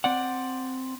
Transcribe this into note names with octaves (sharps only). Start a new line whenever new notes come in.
C4 D5 F#5